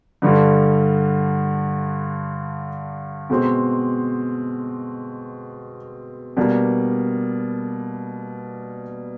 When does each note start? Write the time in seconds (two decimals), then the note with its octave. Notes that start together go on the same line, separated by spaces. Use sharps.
0.22 G2 D3 G3
3.30 B2 G#3 C4
6.37 B2 G3 A#3 D4